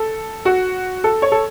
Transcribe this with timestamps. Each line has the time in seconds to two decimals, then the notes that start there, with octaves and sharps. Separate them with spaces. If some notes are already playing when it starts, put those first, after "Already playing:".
Already playing: A4
0.45 F#4
1.04 A4
1.22 C#5
1.32 A4